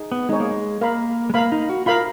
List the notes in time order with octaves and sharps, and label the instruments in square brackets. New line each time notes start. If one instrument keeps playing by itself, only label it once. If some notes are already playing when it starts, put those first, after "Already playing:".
Already playing: [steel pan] D#4 G#4
[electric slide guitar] B3
[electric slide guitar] G#3 [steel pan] D#4 G#4 C#5
[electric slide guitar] A#3
G#3
[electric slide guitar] A#3 [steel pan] A#4 F5 B5
[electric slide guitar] G#3
[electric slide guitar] A#3 [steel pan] A#4 F5 B5
[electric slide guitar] D#4
F#4
[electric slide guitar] F4 [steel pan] A#4 F5 B5